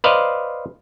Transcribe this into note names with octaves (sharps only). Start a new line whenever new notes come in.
B4 C5 D5 D#5 F5 A#5